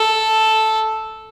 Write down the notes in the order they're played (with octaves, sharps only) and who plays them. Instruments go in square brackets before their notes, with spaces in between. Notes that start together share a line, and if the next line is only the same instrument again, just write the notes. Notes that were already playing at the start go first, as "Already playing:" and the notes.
Already playing: [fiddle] A4